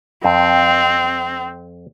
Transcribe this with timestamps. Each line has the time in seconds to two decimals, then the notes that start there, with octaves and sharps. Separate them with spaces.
0.24 F2 C4